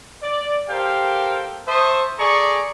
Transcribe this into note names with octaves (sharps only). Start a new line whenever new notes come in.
D5
G4 A4 A#4 C5 F5 G5
C5 E5 A5 C#6 D#6
G#4 A4 D5 A#5 C#6